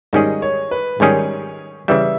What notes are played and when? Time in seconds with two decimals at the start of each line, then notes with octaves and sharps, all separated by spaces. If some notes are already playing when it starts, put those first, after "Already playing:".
0.13 G#2 D#3 G3 C#4 G#4 D#5
0.42 C#5
0.71 B4
1.00 G#2 D#3 G3 C#4 G#4 C#5
1.88 C#3 E3 G3 E5